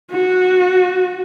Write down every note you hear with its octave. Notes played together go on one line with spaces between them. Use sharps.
F#4